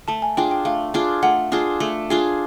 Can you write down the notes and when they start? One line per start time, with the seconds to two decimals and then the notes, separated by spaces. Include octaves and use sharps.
0.08 A3 A5
0.22 G#5
0.37 D4 F4 G#4 G5
0.51 G5
0.65 A3 F5
0.94 D4 F4 G#4
1.23 A3 F#5
1.52 D4 F4 G#4
1.80 A3
2.10 D4 F4 G#4